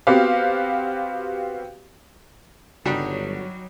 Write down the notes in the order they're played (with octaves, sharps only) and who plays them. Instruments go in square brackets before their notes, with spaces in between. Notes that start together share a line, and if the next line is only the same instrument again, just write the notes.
[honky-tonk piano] B3 C4 F#4 G4 F5
[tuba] G1 [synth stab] C#3 F#4 [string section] F#3 [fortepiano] G3 D4 D#4